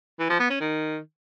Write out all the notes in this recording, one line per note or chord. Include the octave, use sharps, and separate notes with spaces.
E3
F3
B3
C#4
D#3